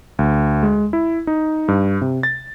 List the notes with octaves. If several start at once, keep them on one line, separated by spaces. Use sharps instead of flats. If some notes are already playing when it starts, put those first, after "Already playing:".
D2
G#3
E4
D#4
G2
C3
A6